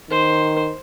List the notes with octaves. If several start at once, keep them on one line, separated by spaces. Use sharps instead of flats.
D#3 C5